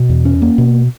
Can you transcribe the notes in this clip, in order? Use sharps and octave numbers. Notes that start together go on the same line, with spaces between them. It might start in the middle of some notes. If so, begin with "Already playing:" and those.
Already playing: B2
E2
C#4
A#3
B2